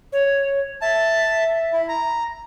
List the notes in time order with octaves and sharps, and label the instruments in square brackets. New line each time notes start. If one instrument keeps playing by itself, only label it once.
[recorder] C#5
[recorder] E5 [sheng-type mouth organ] A5
[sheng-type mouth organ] E4
A#5